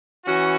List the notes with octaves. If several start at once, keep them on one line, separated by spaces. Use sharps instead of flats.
E3 C#4 F#4